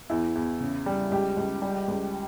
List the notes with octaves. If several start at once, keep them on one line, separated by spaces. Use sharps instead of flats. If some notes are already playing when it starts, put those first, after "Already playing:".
E2 E4
E2
C#3
G3
C#2 G4
C#2
G3
C#2